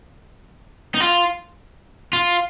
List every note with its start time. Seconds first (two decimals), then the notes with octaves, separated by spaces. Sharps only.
0.94 D#4
1.00 F4
2.13 F4